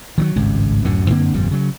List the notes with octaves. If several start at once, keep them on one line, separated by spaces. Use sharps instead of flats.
D#3 E3 F#3
G#1 C#2 G2
D1 F#2 A2 D3
F#2 D3 A#3 C4
G1 F2 A#2 G3
C#3 F#3